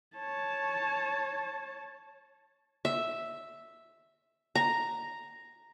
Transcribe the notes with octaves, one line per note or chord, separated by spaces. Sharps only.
C#5 A5
E5
A#5